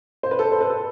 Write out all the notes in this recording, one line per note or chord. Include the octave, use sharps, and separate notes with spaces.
C5
B4
A4
C5
B4
A4